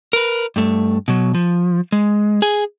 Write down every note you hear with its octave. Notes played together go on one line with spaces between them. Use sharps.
A#4 B4
G2 A3
B2 F#3
F3
G#3
G#4 G#5